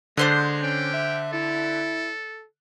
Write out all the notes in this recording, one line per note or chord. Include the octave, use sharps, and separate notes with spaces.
D3 G#3 D4 C5 D#6
C#4 G5
E5
E4 A4